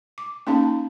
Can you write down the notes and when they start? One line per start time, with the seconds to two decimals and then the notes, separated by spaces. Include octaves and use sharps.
0.18 D6
0.47 A#3 C#4 D#4 F5 A5